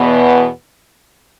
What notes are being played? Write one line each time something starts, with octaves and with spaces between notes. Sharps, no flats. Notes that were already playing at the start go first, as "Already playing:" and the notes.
Already playing: E2 B2 B3